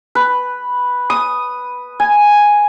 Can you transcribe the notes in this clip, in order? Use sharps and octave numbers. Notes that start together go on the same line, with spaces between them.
B4
D#6
G#5